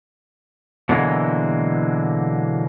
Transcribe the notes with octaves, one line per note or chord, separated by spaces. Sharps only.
B2 D3 E3 F#3 G#3 A#3